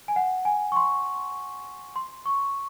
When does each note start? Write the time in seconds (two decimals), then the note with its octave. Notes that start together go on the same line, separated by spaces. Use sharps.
0.08 G#5
0.16 F#5
0.45 G#5
0.72 C#6
0.76 C6
1.96 C6
2.26 C#6